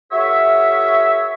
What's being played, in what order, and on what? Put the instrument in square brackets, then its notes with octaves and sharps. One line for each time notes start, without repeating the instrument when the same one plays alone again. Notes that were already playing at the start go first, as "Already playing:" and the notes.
[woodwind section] F#4 G#4 A#4 C#5 E5